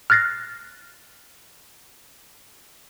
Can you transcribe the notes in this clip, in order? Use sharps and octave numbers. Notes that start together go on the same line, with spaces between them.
F6 F#6 A6 A#6 C7